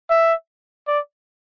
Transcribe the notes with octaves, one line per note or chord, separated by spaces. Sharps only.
E5
D5